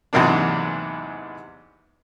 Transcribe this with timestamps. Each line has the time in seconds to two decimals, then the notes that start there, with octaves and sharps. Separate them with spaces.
0.13 E2 G#2 C3 F#3 A#3 D4